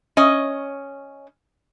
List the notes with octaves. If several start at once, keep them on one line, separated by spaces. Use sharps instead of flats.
C#4 D#5